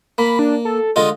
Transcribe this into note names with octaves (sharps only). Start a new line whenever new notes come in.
A#3 B5
D4
A4
D3 G#3 F4 D#5